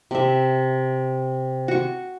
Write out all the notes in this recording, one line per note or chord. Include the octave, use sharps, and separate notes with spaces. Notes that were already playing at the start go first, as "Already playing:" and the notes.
C3 E5
F#4 C#6